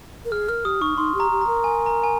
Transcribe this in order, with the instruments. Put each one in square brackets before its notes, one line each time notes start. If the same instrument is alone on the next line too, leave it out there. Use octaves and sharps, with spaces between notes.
[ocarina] A#4
[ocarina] G#4 [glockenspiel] F6
[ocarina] A#4 [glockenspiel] F6
[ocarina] G4 [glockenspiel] D#6
[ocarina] D#4 [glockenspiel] C#6
[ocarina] D#4 [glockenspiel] C6
[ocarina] G4
[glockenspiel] A#5
[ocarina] G4
[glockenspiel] A#5
[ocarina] A#4
[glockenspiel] G#5
A#5
G#5